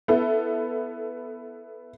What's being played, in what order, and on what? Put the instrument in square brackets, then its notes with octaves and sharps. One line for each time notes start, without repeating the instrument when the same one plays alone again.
[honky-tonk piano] B3 E4 A4